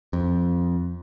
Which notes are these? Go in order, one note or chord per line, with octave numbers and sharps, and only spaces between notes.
F2